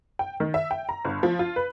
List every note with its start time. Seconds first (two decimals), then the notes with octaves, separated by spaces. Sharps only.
0.19 G5
0.40 D#3
0.54 E5
0.71 G5
0.89 A#5
1.05 G1
1.23 F3
1.39 F4
1.56 B4